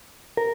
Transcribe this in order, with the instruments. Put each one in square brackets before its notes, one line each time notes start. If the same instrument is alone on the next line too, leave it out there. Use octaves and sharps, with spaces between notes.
[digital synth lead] A#4